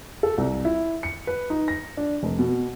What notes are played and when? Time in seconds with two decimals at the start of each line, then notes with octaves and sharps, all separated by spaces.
0.23 A4
0.38 C2
0.65 E4
1.03 C#7
1.27 B4
1.50 D#4
1.68 A#6
1.97 D4
2.23 F1
2.39 B2